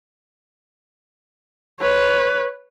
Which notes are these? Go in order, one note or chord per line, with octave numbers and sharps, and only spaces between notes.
B4 C#5